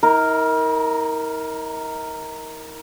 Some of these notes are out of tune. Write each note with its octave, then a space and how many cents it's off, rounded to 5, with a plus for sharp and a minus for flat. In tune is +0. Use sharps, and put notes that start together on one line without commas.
D#4 +45 A#4 -5